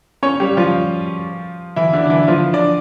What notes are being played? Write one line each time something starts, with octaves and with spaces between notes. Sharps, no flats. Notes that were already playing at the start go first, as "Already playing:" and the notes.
C#4 C#5
G3 G4
F3 F4
E3 E4
D3 D4
D4
E3 E4
F3 F4
D4 D5